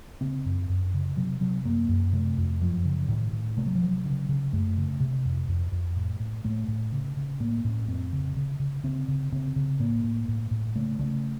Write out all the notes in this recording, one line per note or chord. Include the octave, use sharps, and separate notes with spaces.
C#3 C4
F#2
F#2
C#3
C3 F#3
C3 F#3
F#2 A#3
F#2
C3 A3
F2
F#2 F3
C#3
A2 D#3
A2
C3 A3
F#3
F3
C3 F#3
C#3
C#3
F#2 A3
C#3
C3
F2
F2
F2
A2
A2
A2 A3
A2
C#3
C#3
A2 A#3
A2 C#4
F2 C4
C#3
C#3
C#3
C#3 C4
C#3
C#3 C4
C#3
A2 A#3
A2
A2
A2
C#3 A3
C#3 A3